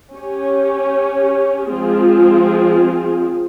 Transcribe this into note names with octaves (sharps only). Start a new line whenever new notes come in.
C#4 G4 C#5
F3 G#3 C4 F4 G#4